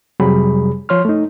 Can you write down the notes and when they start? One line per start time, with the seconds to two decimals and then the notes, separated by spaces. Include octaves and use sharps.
0.20 F2 C3 F#3 G3 G#4 B5
0.89 F3 C#5 C6 F6
1.05 A3 D#4